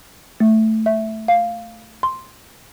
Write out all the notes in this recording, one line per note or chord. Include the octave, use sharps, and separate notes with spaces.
A3
E5
F5
C6